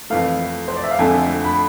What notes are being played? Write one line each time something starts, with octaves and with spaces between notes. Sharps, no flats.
F2 E3 A3 F5
C5
D5
E5
F5
F2 D3 A3 G#5
B5